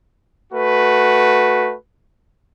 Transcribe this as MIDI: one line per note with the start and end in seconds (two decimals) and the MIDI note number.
0.53 1.74 57
0.53 1.74 66
0.53 1.74 71